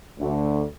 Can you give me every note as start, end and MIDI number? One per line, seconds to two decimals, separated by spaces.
0.19 0.63 38